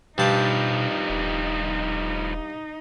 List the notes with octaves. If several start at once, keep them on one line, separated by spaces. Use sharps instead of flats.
G2 B2 F3 G3 D#4 A5
D#1